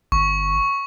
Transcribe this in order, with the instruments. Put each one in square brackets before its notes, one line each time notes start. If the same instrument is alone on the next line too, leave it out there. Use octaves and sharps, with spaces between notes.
[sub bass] G1 [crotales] C#6